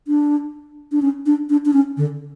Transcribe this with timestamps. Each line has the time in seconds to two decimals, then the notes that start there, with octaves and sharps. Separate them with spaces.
0.08 D4
0.92 D4
1.02 C#4
1.26 D4
1.50 D4
1.65 D4
1.73 C#4
1.97 D3